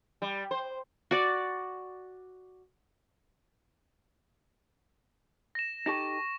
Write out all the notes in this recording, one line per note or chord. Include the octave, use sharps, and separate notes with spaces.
G3
C5
F#4 D5
A#6 E7
D#4 G4 A4 C#6 A#6